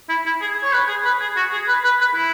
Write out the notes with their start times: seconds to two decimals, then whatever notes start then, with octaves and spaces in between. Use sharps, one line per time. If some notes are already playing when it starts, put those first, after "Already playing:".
0.09 E4
0.26 E4
0.41 G#4
0.63 C#5
0.73 B4
0.88 G#4
1.05 B4
1.21 G#4
1.36 F#4
1.52 G#4
1.68 B4
1.84 B4
2.00 B4
2.16 E4